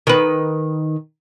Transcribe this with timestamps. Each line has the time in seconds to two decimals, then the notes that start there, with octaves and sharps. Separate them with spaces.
0.07 D#3 B4